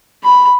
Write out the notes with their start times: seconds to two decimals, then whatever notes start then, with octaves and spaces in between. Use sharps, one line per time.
0.23 B5